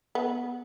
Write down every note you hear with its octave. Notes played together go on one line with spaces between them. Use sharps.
B3